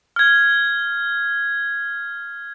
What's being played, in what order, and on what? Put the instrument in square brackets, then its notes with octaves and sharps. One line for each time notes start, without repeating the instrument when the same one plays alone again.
[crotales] F6 G#6